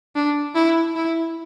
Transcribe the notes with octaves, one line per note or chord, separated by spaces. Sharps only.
D4
E4
E4